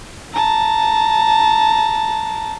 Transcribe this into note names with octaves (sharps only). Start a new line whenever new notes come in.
A5 A#5